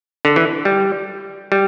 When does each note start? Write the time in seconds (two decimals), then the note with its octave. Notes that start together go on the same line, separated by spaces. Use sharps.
0.25 D3
0.36 E3
0.65 G3
1.52 G3